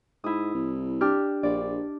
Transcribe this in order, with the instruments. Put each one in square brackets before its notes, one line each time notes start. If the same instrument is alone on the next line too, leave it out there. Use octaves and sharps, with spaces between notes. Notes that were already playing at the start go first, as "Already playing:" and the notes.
[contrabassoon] G#2 [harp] E4 D#6
[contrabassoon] C2
[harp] D4 G4 F6
[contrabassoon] A#1 [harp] D5